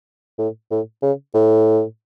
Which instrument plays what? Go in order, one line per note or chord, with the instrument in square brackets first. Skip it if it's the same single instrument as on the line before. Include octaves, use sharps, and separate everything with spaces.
[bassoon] A2
A2
C#3
A2